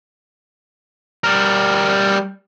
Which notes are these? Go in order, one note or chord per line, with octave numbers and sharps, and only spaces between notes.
G3 A#4